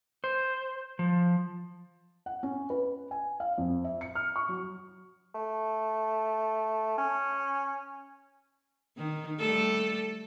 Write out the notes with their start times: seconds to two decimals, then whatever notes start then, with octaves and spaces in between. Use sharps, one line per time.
0.24 C5
0.99 F3
2.26 F#5
2.43 C#4
2.70 B4
3.11 G#5
3.40 F5
3.58 F2
3.84 E5
4.01 C#7
4.15 F6
4.36 C#6
4.49 F#3
5.34 A3
6.98 C#4
8.97 D#3
9.39 G3 A3 A4